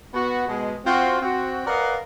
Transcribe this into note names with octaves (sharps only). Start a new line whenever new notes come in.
B3 F#4
B2 G#3
C4 F4 F#4
C4 F#4
A#4 B4 D5 D#5 F5 F#5